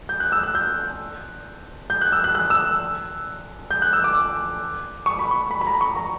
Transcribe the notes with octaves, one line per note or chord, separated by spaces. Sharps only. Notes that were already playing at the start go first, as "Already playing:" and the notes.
G6
F#6
E6
F#6
G6
G6
F#6
E6
F#6
F#6
E6
G6
F#6
E6
D6
C#6
B5
C#6
B5
B5
A#5
C#6
A#5